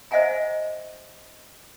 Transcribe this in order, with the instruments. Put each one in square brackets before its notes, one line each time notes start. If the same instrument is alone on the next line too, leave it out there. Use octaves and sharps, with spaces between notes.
[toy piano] C5 D#5 E5 F#5 G#5 A#5